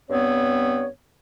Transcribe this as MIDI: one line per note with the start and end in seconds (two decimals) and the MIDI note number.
0.10 0.87 43
0.10 0.87 59
0.10 0.87 60
0.10 0.87 73